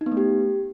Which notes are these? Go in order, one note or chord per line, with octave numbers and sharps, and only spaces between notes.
D#4
B3
A3
G4